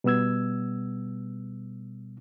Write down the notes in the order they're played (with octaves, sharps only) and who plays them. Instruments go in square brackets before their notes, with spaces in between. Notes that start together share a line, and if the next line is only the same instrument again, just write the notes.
[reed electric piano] B2 G3 B3 E6 G#6